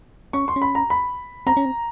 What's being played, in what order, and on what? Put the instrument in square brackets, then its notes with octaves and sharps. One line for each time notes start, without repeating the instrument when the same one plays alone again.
[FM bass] C#4 [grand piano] C#6
[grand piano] C6
[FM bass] C#4
[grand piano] B5
A#5
B5
[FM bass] C4 [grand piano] A#5
[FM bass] C#4
C4